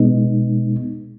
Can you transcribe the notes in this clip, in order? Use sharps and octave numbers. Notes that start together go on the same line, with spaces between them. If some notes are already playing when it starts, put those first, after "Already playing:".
Already playing: B2 G#3 B3 D#4